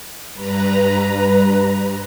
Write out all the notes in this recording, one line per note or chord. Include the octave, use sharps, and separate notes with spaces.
G2 B4 A#5